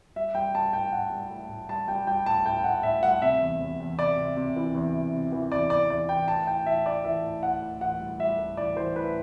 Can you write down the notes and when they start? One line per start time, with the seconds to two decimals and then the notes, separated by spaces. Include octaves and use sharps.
0.16 G3 E5
0.34 G3 G5
0.54 G3 A5
0.73 A2 G5
0.92 A2 F#5
1.12 G3
1.30 A2
1.49 A2
1.69 G3 A5
1.88 G3 G5
2.07 G3 G5
2.26 A2 A5
2.45 A2 G5
2.64 A2 F#5
2.83 A2 E5
3.03 G3 F#5
3.22 C3 E5
3.41 E2
3.60 E2
3.80 E2
3.99 C3 D5
4.17 C3
4.37 C3
4.56 E3
4.75 E2
4.94 C3
5.14 C3
5.32 E3
5.52 E2 D5
5.70 C3 D5
5.90 E2 D5
6.09 E3 G5
6.28 A2 A5
6.47 A2 G5
6.66 E3 E5
6.86 A2 D5
7.04 E3 E5
7.24 A2
7.43 A2 F#5
7.62 A2
7.81 E3 F#5
8.00 G3
8.19 G3 E5
8.38 A2
8.57 E3 D5
8.77 E3 C5
8.96 A2 B4